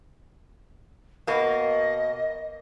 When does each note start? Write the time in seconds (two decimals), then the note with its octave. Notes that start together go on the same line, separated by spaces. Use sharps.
1.27 B2 A#3 D#5